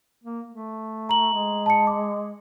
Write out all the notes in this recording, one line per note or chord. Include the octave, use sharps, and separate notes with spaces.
A#3
A3
A#5 F#7
G#3
A5 C#7
D6